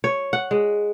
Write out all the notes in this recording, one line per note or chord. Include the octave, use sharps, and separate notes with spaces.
C#5
F#5
G#3